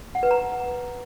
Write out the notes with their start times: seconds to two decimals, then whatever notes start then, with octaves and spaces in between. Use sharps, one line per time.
0.15 F#5
0.23 B4
0.31 A#5